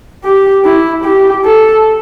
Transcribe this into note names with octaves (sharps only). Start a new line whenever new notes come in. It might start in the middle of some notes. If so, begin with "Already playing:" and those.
G4
E4
G4
A4